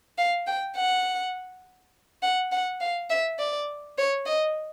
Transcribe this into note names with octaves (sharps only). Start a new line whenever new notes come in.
F5
G5
F#5
F#5
F#5
F5
E5
D5
C#5
D#5